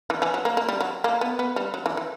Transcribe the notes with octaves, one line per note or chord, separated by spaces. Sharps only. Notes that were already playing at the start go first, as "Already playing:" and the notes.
E3
E3
F#3
A#3
A#3
G3
F#3
A#3
B3
B3
G3
F#3
E3
E3